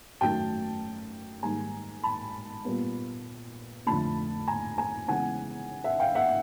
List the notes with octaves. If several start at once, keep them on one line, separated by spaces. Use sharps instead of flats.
F#2 D#3 F#3 A3 G5 A5
G#2 D#3 G3 A#3 G#5 A#5
A5 B5
A#2 G3 B3
F2 D3 F3 A3 A5 B5
G#5 A#5
G#5 A#5
C#3 E3 G#3 B3 F#5 G#5
E5 F#5
F5 G5
E5 F#5